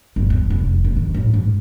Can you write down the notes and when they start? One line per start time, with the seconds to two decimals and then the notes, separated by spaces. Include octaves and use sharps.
0.16 G1
0.30 E2
0.50 F1
0.66 C3
0.84 F#1
0.96 D#3
1.14 A1
1.34 G#2